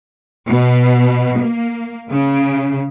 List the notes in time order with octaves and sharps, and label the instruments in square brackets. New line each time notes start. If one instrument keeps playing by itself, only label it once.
[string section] B2
A#3
C#3